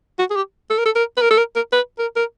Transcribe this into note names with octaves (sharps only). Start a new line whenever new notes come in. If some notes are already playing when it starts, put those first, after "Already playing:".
F#4
G#4
G4
A4
A#4
A4
A#4
B4
A#4
A4
A#4
A#4
B4
A#4
A#4